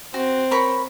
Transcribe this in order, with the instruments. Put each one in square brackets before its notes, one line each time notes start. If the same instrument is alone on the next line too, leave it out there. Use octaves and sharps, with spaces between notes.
[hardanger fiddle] C4 [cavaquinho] F#4
[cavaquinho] A#4 C#5 B5